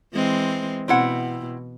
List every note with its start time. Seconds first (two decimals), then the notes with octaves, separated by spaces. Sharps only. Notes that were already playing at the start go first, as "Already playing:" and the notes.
0.13 E3 G#3 C4
0.88 B2 C4 E4 F#5